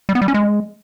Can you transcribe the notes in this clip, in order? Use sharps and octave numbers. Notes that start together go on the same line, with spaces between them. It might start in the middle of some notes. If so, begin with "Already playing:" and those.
G3
B3
G3
C#4
G#3